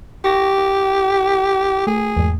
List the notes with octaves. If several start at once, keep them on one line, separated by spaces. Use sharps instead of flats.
G4 C#6 A#6
A3 G#4
E2 G#2